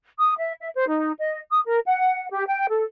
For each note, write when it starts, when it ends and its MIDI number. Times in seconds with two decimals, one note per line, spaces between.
0.18 0.33 87
0.37 0.53 76
0.60 0.69 76
0.75 0.86 72
0.87 1.12 63
1.19 1.39 75
1.50 1.60 87
1.66 1.79 70
1.85 2.27 78
2.30 2.44 67
2.47 2.66 79
2.68 2.84 69